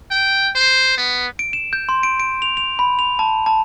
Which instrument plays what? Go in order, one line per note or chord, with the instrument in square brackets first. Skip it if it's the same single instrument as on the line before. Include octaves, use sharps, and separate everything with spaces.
[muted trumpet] G5
C5
B3
[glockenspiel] D7
E7
G6
C6
D7
D7
F7
F7
B5
F7
A5
A5